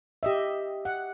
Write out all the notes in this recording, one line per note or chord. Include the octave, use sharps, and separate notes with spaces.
G4 D#5 E5
F#5